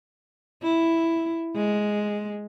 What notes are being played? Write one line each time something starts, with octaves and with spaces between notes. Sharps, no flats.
E4
G#3